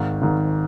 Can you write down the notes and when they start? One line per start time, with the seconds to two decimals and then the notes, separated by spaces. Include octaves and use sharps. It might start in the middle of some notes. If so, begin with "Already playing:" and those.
Already playing: G#1 G#2 D#3
0.22 G#1 G#2 D#3